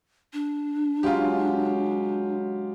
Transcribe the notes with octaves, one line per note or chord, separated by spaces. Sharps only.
D4
C#3 F#3 G#3 F4 G4